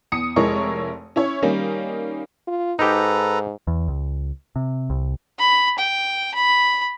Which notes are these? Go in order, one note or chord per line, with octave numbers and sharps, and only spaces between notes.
E2 D#6 C#7
F1 G#3 E4 A#4 C#5 C#6
C#4 E4 C#5
D#3 G3 A#3 C#4 D#4
F4
G#2 D#4 G4 A4 B4 A#5
E2
C#2
C3
C2
B5
G5
B5